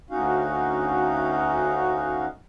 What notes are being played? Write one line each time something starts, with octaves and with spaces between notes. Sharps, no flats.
D2 C#4 D#4 F#4 F5